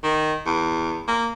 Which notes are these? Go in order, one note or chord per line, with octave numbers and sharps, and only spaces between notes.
D#3
E2
A#3